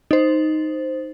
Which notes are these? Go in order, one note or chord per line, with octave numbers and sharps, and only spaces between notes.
D#4 C5